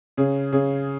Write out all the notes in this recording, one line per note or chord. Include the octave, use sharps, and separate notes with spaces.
C#3 G#4
C#3 G#4